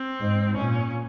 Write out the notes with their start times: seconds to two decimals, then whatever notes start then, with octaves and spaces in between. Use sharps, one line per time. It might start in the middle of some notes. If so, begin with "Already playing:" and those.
Already playing: C4
0.20 G#2
0.57 A#2 C#4